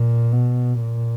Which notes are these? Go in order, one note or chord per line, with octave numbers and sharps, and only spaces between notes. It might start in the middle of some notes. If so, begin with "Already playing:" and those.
Already playing: A#2
B2
A#2